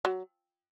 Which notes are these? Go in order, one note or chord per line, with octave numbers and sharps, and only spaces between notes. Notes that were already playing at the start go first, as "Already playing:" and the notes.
F#3